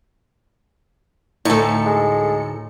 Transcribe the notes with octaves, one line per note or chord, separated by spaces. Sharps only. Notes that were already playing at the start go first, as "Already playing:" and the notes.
D2 A2 D#4 A4 C#7
G#3